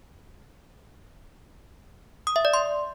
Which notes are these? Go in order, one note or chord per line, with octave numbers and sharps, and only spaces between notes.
D#6
E5
D5
C6